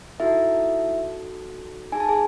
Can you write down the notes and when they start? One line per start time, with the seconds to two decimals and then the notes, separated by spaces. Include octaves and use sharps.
0.20 D#4 E4 F#4 A4 E5
1.92 D#4 G#4 G#5
2.00 A5
2.09 G#4 G#5